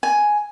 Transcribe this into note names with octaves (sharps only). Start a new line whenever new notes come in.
G#5